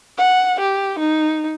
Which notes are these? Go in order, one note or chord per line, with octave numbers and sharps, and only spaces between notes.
F#5
G4
D#4